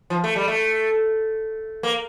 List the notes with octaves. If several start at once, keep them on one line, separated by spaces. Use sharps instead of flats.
F3
A3
G3
A3
A#3